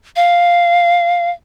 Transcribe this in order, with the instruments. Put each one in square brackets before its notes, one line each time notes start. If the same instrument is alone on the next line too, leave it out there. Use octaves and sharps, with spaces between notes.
[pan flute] F5